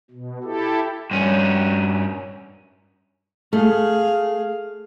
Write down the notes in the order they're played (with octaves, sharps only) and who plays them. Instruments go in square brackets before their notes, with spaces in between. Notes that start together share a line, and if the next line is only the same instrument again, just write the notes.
[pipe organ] B2
E4 G4 A4
[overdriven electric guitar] G2 C#4
[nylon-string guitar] A3 [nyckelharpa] G#4 F5